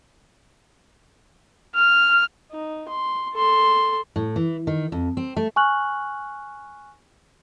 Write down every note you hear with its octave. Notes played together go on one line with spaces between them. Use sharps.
F6
D#4
C6
A4 C6
A2
E3
D#3
F2
C4
A3
G#5 C#6 F6 F#6 F#7